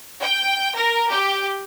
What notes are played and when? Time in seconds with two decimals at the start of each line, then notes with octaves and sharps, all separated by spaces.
0.22 G5
0.76 A#4
1.11 G4